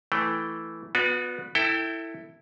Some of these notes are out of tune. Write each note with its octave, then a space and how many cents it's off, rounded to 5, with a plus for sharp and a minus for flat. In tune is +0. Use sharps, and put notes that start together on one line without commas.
E3 +0 A3 +0 G5 +0
B3 +0 F#4 -40 D5 +0
E4 +0 A4 +25 G5 +0